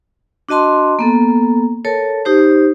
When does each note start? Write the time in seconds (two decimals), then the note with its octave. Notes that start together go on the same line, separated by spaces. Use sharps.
0.49 D4 F#4 D#5 A5 C6
0.99 A#3 B3 A4
1.85 A4 A#4 C#5 A5
2.25 D#4 G4 C5